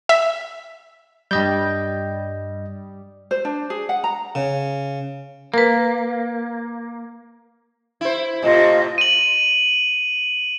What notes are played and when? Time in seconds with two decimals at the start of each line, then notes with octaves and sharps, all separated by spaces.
0.09 E5
1.31 G2 G3 D#5 G6
3.31 C5
3.45 D4
3.70 G#4
3.89 F#5
4.04 A#5
4.35 C#3
5.54 A#3 A#4 B4
8.01 E4 C5
8.42 A2 C3 F4 D#5 A5
8.98 D#7 F#7